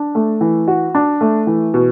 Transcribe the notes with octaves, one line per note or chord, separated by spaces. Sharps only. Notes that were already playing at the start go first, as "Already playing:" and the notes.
Already playing: D4
A3
E3
F#4
D4
A3
E3
B2